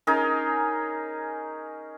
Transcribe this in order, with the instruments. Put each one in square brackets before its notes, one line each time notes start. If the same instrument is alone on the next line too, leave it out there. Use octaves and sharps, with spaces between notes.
[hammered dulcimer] C#4 D#4 G#4 A#4